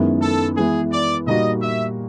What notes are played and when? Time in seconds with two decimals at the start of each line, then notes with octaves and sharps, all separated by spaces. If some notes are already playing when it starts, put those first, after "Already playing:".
Already playing: F#2 D#3 G#3 B3 E4
0.22 A4
0.57 E3 G#3 B3 G#4
0.92 D5
1.27 A#2 G3 A#3 D#4 F#4 D#5
1.61 E5